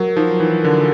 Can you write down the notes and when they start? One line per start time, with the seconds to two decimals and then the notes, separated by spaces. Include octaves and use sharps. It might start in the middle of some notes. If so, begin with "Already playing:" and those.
Already playing: F#3 A#4
0.17 F3 D#4
0.40 E3 D#4
0.63 D3 A#4